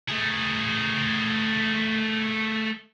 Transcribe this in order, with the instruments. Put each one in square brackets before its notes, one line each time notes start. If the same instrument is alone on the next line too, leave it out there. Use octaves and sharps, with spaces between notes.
[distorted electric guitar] A3 G#4